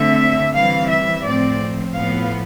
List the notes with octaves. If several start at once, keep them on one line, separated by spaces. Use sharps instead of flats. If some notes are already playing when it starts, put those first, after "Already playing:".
Already playing: D3 A3 C4 E5
E3 G3 C4 F5
E5
A2 F3 C4 D5
A2 F3 B3 F5